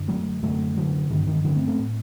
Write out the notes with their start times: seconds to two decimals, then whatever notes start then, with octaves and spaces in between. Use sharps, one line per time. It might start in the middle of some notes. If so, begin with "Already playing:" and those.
Already playing: F#2 D3
0.08 F#3 A3
0.42 F#2 D3 F#3 A3
0.77 D3 F#3
1.10 G2 D3 D#3
1.27 D#3
1.44 D3 F#3
1.56 A3 C4
1.67 A3 C4
1.79 A2